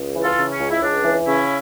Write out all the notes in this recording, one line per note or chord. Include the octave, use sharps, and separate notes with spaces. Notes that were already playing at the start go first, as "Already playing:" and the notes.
Already playing: C#2
E3
F4 A4
C#3
C#4
C#2
E4
C#2 D4
E3
C#3 C#4 E4